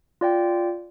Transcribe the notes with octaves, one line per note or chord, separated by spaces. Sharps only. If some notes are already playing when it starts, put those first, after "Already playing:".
F4 D5 G5